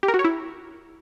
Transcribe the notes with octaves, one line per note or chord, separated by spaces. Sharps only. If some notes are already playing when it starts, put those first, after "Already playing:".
G4
A#4
F#4
C#5
E4